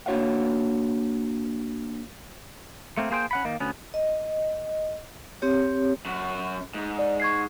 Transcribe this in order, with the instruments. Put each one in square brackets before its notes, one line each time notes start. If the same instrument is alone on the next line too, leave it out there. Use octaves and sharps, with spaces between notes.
[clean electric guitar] A#3 D4 F#4 C#5 F5 F#5
A3 A#3 C4
A#3 G#4 C5 G5
C#4 F#5 B5
D#3 A#3 D#4
D2 B3 C#4
[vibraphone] D#5
C4 G4 C#5
[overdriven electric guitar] F#2 F#4
G#2
[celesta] D5
C#6 G#6 C7